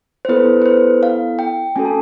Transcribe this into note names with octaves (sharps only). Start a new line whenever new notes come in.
C5
B3 E4 A4 B4
B4
C5
F5
G5
A3 C#4 F#4 A4 G#5
A5